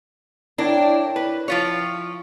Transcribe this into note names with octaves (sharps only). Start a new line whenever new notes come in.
D4 E4 A#4 C#5 G5
B4
F3 F4 C#5 C#6 B6 C7